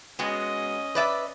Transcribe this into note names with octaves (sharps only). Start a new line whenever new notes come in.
G#3 B3 C#4 F#4 D#5
B4 D5 E5